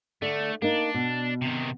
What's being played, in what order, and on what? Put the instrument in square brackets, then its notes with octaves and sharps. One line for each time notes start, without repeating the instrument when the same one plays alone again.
[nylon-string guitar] D3 [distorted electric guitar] A3
[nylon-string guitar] A#3 D#4 [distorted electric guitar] D4
[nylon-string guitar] B2
[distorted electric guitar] C3 D#3